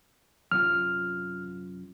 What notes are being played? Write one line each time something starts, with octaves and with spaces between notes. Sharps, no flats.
F#2 C3 F4 F6